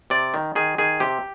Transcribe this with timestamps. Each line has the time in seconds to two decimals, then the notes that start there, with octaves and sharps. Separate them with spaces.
0.10 C3 D5
0.34 D#3
0.55 D#3 G#4
0.78 D#3 G#4
1.00 C3 G4